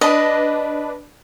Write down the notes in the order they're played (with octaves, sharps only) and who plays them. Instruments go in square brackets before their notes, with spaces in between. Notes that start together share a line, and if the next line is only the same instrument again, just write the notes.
[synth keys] D4 B4 [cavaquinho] D#5